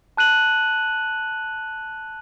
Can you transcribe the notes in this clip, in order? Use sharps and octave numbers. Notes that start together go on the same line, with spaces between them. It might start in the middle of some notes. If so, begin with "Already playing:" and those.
A5 F#6 D#7 F#7